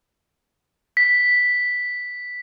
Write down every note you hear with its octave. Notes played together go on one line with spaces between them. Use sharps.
B6